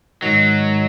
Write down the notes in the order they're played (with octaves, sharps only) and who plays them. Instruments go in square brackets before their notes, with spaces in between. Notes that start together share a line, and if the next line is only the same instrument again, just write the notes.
[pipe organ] G#2 D#3 G#3 F#4 [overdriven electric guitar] F#3